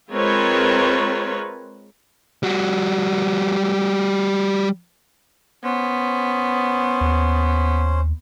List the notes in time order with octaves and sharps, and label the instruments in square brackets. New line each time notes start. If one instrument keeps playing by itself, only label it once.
[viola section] G#3 C4 F4 A#4 B4 C#5
[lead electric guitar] G3 F#4
[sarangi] B3 [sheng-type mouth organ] C#4 C5
[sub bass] D#2